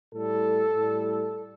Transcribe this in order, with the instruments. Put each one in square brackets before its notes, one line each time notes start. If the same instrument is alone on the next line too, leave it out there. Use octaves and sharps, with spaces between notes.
[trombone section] A2 G3 A4
A2 G3